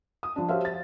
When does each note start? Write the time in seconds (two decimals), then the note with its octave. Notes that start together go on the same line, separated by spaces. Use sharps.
0.23 D#6
0.36 F3 D4
0.49 F#4 G4 C5 C#5 E5 F5
0.65 A6